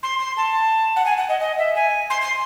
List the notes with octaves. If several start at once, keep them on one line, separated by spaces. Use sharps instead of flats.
C6
C6
A5
F#5
G#5
F#5
D#5
D#5
E5
G#5
C6
C6